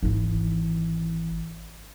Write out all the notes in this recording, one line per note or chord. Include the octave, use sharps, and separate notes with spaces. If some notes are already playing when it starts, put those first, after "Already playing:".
G#1 E3